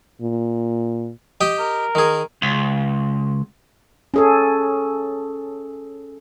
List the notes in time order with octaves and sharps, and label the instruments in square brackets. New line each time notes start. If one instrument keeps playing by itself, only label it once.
[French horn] A#2
[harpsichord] G4 D#5 G5
[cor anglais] A#4
[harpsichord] D#3 G#4
[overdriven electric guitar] C#2
[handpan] C#4 G#4 A4